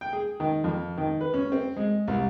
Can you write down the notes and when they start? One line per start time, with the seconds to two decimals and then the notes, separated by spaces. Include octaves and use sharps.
0.01 G5
0.13 G#4
0.40 D#3
0.64 F2
0.98 D#3
1.21 B4
1.34 C#4
1.52 C4
1.76 G#3
2.08 C2